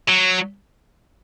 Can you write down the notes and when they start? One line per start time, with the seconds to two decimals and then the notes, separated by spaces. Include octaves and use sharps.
0.08 F#3